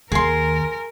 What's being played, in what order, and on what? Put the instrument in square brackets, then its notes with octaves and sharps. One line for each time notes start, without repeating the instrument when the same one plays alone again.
[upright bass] D#2 [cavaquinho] G#4 C6 [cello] A#4